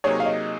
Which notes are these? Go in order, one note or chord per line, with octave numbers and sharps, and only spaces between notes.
C3 F#3 A#3 D#4 G#4 C#5
F5
D#5